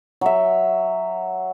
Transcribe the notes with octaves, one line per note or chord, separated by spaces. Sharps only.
F#3 E5